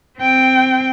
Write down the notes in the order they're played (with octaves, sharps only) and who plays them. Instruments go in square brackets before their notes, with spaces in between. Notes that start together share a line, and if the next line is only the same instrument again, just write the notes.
[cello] C4 G5